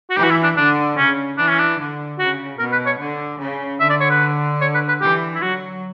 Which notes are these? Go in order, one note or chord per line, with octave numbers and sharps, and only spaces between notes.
F#4
E3 G4
F#4
E4
D4
D3 D4
C#3 C#4
E3 D4
C#4
D4
D3
C#3 F#4
B2 A#4
B4
C#5
D3
C#3
D3 E5
D5
C#5
B4
C#5
B4
B4
E3 G4
E4
F#3 F#4